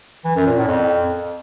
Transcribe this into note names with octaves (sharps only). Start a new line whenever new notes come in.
E3
F#2
A#2
A2
F2